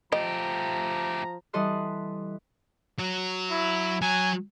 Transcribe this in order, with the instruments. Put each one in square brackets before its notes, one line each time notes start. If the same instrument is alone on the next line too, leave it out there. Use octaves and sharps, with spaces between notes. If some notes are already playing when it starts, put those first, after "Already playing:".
[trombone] F3 [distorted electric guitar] A3 G4 [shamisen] D#5 [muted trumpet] A#5
[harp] E3 G3 A4 D#5 C6 F#6
[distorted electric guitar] F#3
[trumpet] E4
[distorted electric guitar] F#3 [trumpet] G#5